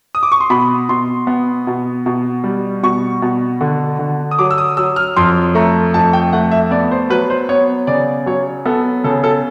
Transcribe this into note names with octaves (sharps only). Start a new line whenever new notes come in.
D#6
D6
C#6
C6
B2 B5
B2 C6
B3
B2
B2
G3
B2 C#6
B2
D3
D3
D#6
F#3 D6
E6
D#6
F#3 E6
F6
F2 C6
A3 A#5
F2 A5
G5
A3 F#5
E5
B3 D5
C5
F#3 B4
C5
B3 C#5
C#3 D5
F#3 C#5
B3 A4
C#3 A4
A4